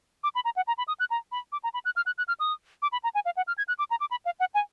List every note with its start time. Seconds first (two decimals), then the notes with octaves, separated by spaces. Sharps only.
0.24 D6
0.35 B5
0.45 A#5
0.56 F#5
0.67 A#5
0.78 B5
0.88 D#6
1.00 F#6
1.11 A#5
1.32 B5
1.52 D6
1.64 A#5
1.74 B5
1.85 F#6
1.96 F6
2.06 F#6
2.18 F#6
2.28 F6
2.40 D#6
2.82 D6
2.92 B5
3.04 A#5
3.15 G#5
3.25 F5
3.37 F#5
3.47 F6
3.58 G#6
3.68 F#6
3.79 D6
3.91 A#5
4.00 D6
4.11 B5
4.25 F5
4.40 F#5
4.54 G#5